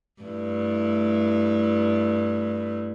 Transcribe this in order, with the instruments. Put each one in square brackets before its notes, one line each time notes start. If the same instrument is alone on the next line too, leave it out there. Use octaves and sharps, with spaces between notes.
[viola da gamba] G2 A3 E4